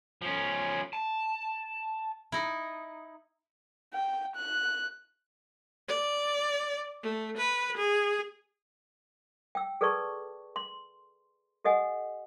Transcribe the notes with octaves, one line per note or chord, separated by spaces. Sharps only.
F3 C#4
A5
D#4 E4
G5
F#6
D5
A3
B4
G#4
G5 E6
G#4 A4 B4 D5 A5 C#6
C6
G4 A4 D#5 F#5 G#5